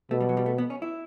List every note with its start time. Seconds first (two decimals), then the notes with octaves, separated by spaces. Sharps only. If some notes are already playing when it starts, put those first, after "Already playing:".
0.11 B2 A3
0.21 G3
0.29 F#3
0.37 G3
0.46 A3
0.58 B3
0.70 C#4
0.82 E4